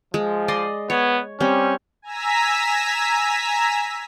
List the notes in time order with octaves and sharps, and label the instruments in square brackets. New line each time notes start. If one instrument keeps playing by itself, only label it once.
[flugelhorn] F3 [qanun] G#3
[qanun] D5 D#5 C6
[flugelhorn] B3 [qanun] C#5
[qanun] G3 C4 [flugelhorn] C#4
[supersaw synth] G#5 A#5 E6 B6